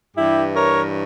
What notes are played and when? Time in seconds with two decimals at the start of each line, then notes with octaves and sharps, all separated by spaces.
0.16 G2 E3 E4 G4
0.55 A#4 C#5